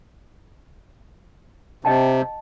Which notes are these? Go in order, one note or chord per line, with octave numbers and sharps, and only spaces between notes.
C3 D#5 G5 A5